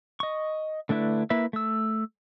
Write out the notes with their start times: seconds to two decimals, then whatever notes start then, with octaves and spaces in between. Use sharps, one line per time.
0.20 D#5 C#6
0.89 D3 A3 D4 E4 B4
1.30 A#3 E4 B4 E5
1.53 A3 E6